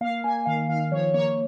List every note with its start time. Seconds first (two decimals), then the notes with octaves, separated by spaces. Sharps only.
0.01 A#3 F5
0.24 A#3 G#5
0.46 D#3 F5
0.69 D#3 F5
0.92 F3 C#5
1.14 A#3 C#5